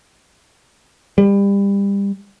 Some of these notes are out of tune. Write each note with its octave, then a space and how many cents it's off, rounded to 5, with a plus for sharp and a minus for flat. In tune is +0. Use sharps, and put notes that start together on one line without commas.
G3 +25